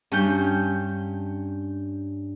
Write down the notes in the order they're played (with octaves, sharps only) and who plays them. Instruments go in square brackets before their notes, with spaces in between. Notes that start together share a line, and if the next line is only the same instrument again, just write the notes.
[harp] G2 C#4 G6